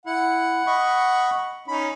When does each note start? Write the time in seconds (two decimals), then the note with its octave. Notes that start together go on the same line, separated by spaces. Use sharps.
0.06 E4 F#5
0.67 D#5 B5 C#6
1.68 C#4 D#4 B5